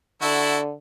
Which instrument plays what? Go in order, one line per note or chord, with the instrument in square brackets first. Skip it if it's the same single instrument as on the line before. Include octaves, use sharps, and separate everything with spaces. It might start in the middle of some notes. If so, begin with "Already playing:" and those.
[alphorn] D3 [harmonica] E4 F#4 A4